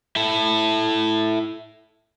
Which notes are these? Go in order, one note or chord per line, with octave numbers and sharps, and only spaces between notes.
E4 A4